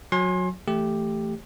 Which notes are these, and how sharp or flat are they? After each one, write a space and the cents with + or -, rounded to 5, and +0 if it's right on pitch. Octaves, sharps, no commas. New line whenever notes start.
F#3 -20 G#5 +0 C6 +30
E3 +0 A3 +0 G4 +5